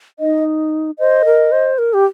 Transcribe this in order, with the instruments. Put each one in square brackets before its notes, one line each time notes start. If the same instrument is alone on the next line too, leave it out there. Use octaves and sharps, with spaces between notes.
[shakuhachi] D#4 [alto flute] D#5
[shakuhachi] C5 [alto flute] D#5
[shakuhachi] A#4
C5
A#4
G4